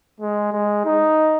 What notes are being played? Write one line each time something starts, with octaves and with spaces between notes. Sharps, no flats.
G#3
G#3
D#4